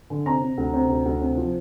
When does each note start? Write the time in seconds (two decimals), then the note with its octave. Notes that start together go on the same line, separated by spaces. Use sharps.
0.10 D3
0.26 C3 A#5
0.42 C3
0.58 D2
0.73 C3
0.89 D2
1.06 D2
1.21 C3
1.37 F3